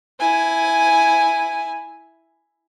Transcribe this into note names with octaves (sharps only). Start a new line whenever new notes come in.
E4 G#5